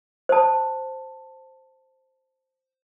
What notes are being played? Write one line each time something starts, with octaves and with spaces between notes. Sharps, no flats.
C5 A5